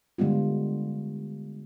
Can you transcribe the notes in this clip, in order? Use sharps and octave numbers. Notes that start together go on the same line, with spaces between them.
D3 G3 G#3 B3 F4